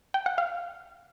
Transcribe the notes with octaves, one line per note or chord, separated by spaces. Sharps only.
G5
F#5
F5